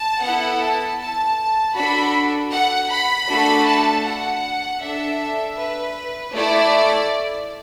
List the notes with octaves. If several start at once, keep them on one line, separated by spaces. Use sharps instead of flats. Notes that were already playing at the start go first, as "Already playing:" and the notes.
Already playing: A5
B3 E4 A4 F#5
A5
A5
D4 F#4 A4 B5
F#5
B5
A3 D4 F#4 A4
A5
F#5
D4 A4 E5
B4
A3 E4 D5